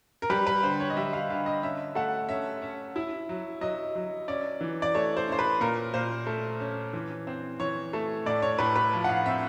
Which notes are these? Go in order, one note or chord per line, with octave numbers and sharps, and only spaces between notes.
A#4
G3 B4
B4
D3 C5
C#5
D#5
G3 E5
F5
D3 F5
D#5
C#4 E5
A3 F#5
C#4 E5
C#4
E4
F#3
F#3 D#5
F#3
C#4 D5
E3
D5
A3 C#5
C5
C#4 C5
B4
A#2 A#4
A#2 C5
A3
C#4
E3
C4
E3 C#5
A3
A2 D5
C#5
A2 B4
B4
F3
F#5
F5
C4 E5